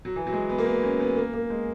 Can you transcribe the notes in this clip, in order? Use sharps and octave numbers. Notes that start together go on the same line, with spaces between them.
F#3
E3
F#3
G#3
B3
A#3
B3
C#4
B3
A#3
A#3
G#3